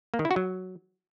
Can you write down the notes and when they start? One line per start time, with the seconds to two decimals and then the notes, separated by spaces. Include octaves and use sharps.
0.14 A#3
0.19 D#3
0.25 E4
0.31 F#4
0.36 F#3